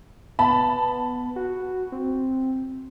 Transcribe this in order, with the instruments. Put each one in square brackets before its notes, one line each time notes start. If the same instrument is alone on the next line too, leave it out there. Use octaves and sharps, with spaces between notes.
[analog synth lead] B3 [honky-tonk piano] A5 B5
[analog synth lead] F#4
C4